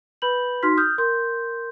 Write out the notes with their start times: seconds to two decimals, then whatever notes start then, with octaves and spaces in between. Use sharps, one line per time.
0.22 B4 B5 G6 F#7
0.63 D#4 F#4 C6 F6 B6
0.77 D#6 F6 G6
0.98 A#4 C6 G6